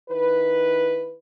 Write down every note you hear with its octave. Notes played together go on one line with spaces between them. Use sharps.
D#3 E4 B4